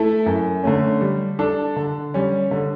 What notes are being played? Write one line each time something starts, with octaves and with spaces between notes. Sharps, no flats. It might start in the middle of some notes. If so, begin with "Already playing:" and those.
Already playing: A3 E4 A4 E5
F#2
D3 A3 C#4
G3
D4 A4
D3
G3 C#4
D3